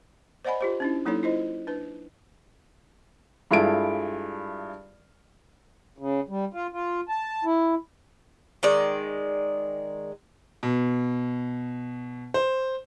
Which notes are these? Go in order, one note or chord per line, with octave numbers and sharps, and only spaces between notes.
C5 D5 D#5 F#5 G#5 B5
F4 G4 C5
C#4 D4 E4
F#3 A#3 D#4 E4 A4 C#5
E4 F4 C5 D#5
D4 B4
G2 G#3 E4 F4 A4 D7
C#3
G3
F4
F4
A5
E4
D#3 G#3 D5
B2
C5